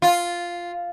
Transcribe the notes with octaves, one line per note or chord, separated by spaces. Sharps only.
F4